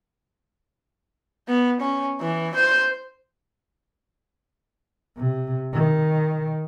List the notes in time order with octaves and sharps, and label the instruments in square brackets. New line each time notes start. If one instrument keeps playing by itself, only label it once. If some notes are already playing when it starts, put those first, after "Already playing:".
[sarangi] B3
C#4
E3
C5
[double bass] C3
D#3